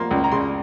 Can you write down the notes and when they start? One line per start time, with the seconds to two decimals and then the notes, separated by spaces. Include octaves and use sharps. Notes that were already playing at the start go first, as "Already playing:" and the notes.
Already playing: F3 A#3 C6
0.11 C#2
0.24 A#5
0.32 C#3 C6